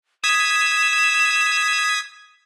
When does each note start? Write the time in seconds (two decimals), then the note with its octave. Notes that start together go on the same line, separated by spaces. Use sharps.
0.24 D#6 G#6 B6 E7